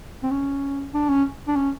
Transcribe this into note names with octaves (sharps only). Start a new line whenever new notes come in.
C4
C#4
D4
C#4
D4
C#4